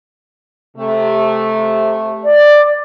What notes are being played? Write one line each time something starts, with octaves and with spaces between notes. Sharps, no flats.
C3 A3
D5